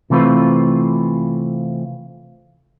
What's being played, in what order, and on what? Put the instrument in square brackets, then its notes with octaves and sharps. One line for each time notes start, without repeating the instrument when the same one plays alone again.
[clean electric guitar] C3 E3 A3 C4 F4 B4